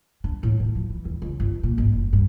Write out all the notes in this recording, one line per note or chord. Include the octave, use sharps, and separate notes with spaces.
D4
A2
D3
F3
E3
E2
C#2
G1
A#2
G#1
F#1
G2